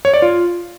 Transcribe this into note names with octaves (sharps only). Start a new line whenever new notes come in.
C#5
D5
F4